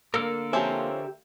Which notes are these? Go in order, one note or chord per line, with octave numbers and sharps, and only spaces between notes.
D3 A#3 A4 A#4
F3 C4 C#4 G4 E5